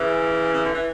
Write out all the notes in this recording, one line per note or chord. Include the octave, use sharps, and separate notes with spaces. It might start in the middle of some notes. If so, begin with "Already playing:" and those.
Already playing: C#3 E3
C#3
D3
E3